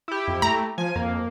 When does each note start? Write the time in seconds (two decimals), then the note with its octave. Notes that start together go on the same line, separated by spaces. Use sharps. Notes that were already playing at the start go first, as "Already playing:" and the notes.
0.08 E4 G4
0.28 F2
0.42 A3 A#5
0.78 F3 G#5
0.96 F2 A#3